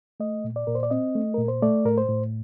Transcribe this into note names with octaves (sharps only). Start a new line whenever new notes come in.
A3 D#5
A#2
D5
A#2 A#4
C5
D5
C4 D#5
A3
A#2 A#4
C5
A3 D5
A2 A#4
C5
A2